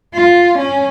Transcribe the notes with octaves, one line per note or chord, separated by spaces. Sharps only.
F4
C#4